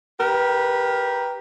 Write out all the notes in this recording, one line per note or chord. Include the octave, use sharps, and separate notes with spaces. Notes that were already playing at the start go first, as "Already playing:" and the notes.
G4 A#4 B4